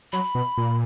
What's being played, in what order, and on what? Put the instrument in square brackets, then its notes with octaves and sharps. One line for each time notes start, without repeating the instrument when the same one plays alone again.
[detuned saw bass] F#3 [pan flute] B5
[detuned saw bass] B2
A#2